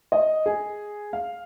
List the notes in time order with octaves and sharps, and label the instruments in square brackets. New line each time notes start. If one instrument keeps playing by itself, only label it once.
[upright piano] D#5
G#4
F5